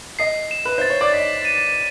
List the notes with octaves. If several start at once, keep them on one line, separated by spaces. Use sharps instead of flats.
D#5 C7
E7
B4
C5 A6
C#5
D5
D#5 B6
D#7